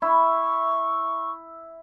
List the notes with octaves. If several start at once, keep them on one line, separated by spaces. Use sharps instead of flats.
E4 C#6